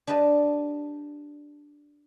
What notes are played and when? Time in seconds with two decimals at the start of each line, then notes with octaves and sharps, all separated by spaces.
0.07 D4 G4 B4 D#5 A5